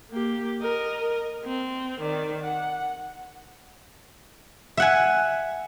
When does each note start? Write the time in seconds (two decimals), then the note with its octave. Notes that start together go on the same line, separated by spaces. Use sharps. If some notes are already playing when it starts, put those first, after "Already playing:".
0.11 A#3 G4
0.61 A#4 D#5
1.45 C4
2.00 D#3 D5
2.43 F#5
4.77 E5 F#5 G#5